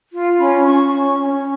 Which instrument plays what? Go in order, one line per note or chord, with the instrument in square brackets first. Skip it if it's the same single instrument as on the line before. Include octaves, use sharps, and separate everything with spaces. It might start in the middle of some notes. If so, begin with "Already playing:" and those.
[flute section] F4
C#4 B5
C#4 C#6
C#4
C#4